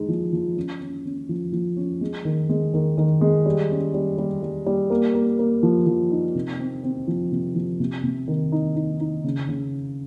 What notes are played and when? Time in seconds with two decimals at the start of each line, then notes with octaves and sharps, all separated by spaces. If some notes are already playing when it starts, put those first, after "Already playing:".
Already playing: G#3 D#4
0.09 F3
0.33 F3
0.57 C#4
0.81 C#4
1.05 C#4
1.29 F3
1.53 F3
1.76 C#4
2.01 G#3
2.25 D#3
2.49 G#3
2.74 D#3
2.98 D#3
3.21 G#3
3.46 G3
3.70 C#4
3.94 G3
4.18 G3
4.43 G3
4.66 G3
4.90 A#3
5.15 A#3
5.39 A#3
5.63 F3
5.87 F3
6.12 D#4
6.35 C3
6.60 C4
6.84 C4
7.08 F3
7.32 C3
7.55 F3
7.80 C3
8.03 C3
8.28 D#3
8.52 D#4
8.76 D#4
9.00 D#4
9.24 C#3
9.49 C#3